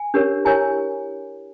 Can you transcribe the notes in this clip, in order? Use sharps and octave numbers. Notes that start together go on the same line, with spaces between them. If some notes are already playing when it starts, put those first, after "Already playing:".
Already playing: G#5
D4 G4 A#4 C#5
E4 G4 A#4 C#5 G#5